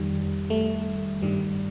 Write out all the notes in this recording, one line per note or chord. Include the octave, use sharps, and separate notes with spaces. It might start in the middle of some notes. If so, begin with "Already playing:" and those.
Already playing: F2 D#3 G3
A3
G2 D#3 G3